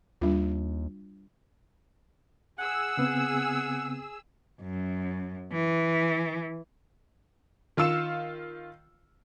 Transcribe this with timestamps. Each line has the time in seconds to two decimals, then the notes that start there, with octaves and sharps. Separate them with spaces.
0.21 D#2 G3 D4 F4
2.59 G#4 F#5 E6
2.97 C#3 B3 C4
4.62 F#2
5.53 E3
7.77 D#3 F4 F5 E6 C#7 E7